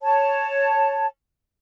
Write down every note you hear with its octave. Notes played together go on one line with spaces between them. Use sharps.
C#5 A5